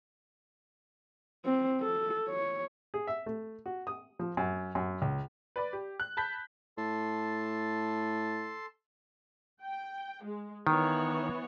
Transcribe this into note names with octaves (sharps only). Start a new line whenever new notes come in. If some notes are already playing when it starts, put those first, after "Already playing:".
C4
A4
C#5
G#4
E5
A3
F#4
D#6
F3
F#2
F#2
C#2
B4 D5 B5
G4
F#6
A5 B5 G6 B6
A2 A4 A5 C6
G5
G#3
D#3 E3 B3 C#5